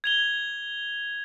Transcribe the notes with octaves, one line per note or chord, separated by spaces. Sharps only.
G#6 F7 G7